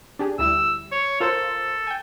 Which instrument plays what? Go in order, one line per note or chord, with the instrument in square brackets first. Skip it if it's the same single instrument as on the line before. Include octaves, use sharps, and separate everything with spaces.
[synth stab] D4 G4 G#4
[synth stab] D2 G3 E4 [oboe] E6
[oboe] C#5
[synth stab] F4 A#4 C5 [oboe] A4
[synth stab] G5 G#5